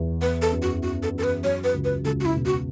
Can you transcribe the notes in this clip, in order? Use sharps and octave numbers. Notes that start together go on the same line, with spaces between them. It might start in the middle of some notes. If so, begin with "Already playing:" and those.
Already playing: E2
B3 B4
A4
F#2
F#4
F#2 F#4
A4
F#2 A4
B4
F#3 C#5
B4
C#2
B4
C#2 A4
F#4
E4
B2
F#4